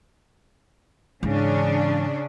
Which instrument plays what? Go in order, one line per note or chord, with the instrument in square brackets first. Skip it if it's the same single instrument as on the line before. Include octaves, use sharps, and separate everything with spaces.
[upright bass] G#2 E3 [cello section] C#3 C#4 D4